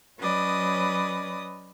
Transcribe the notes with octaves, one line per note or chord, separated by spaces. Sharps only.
F#3 C#4 B4 D5 D#5 D#6